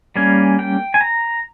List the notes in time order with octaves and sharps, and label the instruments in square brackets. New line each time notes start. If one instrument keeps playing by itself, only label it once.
[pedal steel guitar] G3 A#3 C#4 G#5
G5
G#5
A#5